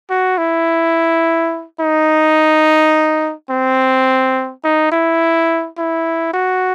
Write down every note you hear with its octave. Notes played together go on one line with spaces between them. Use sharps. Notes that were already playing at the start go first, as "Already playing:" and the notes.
F#4
E4
D#4
C4
D#4
E4
E4
F#4